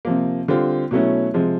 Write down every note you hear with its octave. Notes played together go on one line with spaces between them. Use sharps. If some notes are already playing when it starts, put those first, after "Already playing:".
C3 F3 A#3
D3 G3 C4 F4
B2 F#3 A3 C#4 E4
C3 F3 G#3